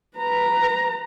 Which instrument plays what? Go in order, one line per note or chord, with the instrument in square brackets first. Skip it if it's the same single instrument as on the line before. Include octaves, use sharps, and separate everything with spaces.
[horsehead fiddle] B4 A#5